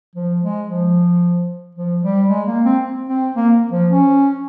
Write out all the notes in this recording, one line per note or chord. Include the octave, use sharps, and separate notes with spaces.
F3
G#3
F3
F3
G3
G#3
A#3
C4
C4
A#3
F3
C#4